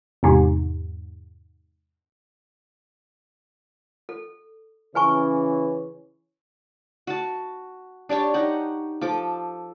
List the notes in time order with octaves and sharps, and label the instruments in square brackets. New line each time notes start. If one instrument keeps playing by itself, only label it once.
[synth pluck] E2 G#2 C3
[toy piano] A4
[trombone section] C#3 E3 C#4 [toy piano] B4 G#5 C#6
[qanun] F#4 A5
D4 G4 C#5 A5
D#4 G4 F#5
F3 A4 D6